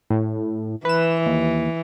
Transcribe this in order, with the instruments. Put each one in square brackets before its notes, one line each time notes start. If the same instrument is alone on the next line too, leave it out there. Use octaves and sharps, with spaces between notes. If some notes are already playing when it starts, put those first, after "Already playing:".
[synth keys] A2
[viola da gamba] E3 [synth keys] B4 E7
[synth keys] D#2